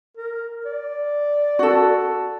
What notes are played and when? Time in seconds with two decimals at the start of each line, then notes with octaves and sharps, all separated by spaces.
0.17 A#4
0.66 D5
1.59 F#4 A4